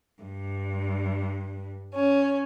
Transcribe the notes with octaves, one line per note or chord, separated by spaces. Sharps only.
G2
C#4